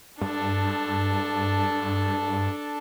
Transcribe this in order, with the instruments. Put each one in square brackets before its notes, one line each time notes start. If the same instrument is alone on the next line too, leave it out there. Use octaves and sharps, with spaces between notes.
[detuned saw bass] G2 [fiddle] D4 A4